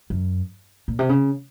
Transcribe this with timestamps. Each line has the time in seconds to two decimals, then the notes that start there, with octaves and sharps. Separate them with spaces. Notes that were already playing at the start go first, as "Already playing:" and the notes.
0.10 F#2
0.88 A#2
0.99 C3
1.09 C#3